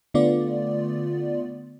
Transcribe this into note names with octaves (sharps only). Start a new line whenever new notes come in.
D3 A3 B3 F4 D5